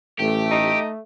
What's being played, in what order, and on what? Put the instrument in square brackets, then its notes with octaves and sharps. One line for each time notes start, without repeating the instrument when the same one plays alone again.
[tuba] A1 [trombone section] A3 [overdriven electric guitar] G4
[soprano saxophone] D#4